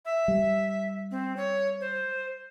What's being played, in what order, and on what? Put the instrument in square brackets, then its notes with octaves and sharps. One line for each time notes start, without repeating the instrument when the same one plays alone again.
[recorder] E5
[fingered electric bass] G3
[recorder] C4
C#5
C5